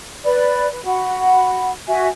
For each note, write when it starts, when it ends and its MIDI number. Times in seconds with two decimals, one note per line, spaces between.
0.25 0.66 71
0.25 0.66 74
0.25 0.66 83
0.72 0.81 71
0.85 1.72 66
0.85 1.72 78
0.85 1.72 83
1.88 2.08 66
1.88 2.08 76
1.88 2.08 80